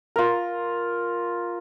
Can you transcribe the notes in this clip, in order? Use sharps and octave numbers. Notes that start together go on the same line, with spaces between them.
F4 A#4